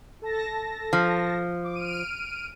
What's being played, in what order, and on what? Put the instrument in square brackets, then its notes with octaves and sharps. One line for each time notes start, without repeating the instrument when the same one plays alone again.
[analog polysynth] A4 A5 A#6
[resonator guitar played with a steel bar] F3
[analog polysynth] D6
F6 D7 D#7